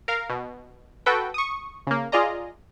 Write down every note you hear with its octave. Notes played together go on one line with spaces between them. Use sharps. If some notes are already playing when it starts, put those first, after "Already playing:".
A#4 F5
B2
F#4 A4 B4 G5
C#6 D#6
C#3 A#3
F4 G#4 D5 D#5 A#5